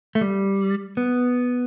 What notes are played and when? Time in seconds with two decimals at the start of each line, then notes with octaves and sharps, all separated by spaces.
0.15 A3
0.21 G3
0.97 B3